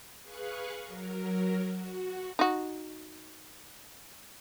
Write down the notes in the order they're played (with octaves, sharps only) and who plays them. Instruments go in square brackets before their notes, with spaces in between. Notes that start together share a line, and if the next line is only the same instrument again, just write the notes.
[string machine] G#4 B4 F5 C#6 F#6
F#3 A#4
F#4
[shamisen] D#4 F#4